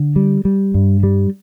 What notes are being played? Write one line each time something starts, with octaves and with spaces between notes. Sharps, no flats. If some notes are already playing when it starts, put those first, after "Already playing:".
Already playing: D3
G3
G3
G2
G3